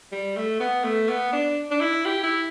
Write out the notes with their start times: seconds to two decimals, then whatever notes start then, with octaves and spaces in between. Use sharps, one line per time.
0.12 G3
0.36 A3
0.60 B3
0.84 A3
1.09 B3
1.33 D4
1.71 D4
1.81 E4
2.06 G4
2.23 E4